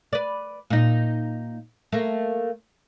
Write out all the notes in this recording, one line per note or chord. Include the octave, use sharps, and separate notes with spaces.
B4 D5
A#2 D#4
A3 A#3